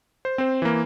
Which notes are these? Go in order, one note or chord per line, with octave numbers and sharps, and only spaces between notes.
C5
C4 C5
E3 A#3